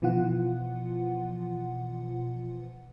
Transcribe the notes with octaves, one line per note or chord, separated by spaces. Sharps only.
B2 E3 F3 F4 F#5